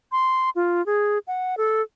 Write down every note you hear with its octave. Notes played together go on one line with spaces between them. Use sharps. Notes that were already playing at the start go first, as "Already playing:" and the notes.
C6
F4
G#4
F#5
A4